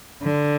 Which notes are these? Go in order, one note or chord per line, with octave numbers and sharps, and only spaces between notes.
D3